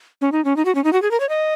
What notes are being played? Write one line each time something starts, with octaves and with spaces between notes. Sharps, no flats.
C#4
D#4
C#4
D#4
F#4
C#4
D#4
F#4
G#4
A#4
C#5
D#5